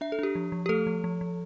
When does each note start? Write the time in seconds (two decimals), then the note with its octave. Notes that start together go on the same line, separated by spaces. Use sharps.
0.01 D4 E5
0.12 A4
0.19 D4 G4
0.35 F3
0.52 F3
0.66 G4
0.69 A3 A4
0.87 F3
1.04 F3
1.21 F3